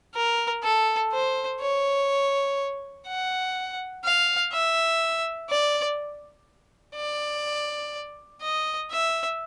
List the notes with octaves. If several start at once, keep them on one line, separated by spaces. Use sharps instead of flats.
A#4
A4
C5
C#5
F#5
F5
E5
D5
D5
D#5
E5